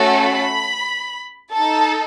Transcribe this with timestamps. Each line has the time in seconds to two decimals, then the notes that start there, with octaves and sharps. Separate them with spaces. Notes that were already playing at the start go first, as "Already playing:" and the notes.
Already playing: A3 C#4 F#4 A4
0.21 B5
1.54 D#4 A4 A5